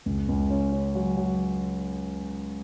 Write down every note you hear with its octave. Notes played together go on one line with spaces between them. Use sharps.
C#2
C#2
C#4
C#4
F#3
F#3